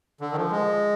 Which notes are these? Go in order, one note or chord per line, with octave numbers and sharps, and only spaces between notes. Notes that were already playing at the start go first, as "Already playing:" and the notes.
D3
D#3
F3
G#3